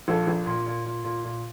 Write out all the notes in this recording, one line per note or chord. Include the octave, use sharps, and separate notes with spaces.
A#1 F4 A4
A#1
A#2
A#2
A#2
A#2
A#2